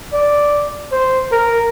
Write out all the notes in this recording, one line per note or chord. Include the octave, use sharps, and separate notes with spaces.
D5
C5
A#4